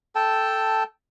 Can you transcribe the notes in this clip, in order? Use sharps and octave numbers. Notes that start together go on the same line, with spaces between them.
A4 G5 A5